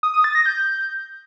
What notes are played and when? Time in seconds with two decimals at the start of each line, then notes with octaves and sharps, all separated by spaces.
0.03 D#6
0.14 D#6
0.24 A6
0.35 A#6
0.46 G6